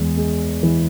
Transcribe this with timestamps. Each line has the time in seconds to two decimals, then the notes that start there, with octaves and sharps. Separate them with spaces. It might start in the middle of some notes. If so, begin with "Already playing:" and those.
Already playing: E2 G#3
0.17 G#3
0.63 E3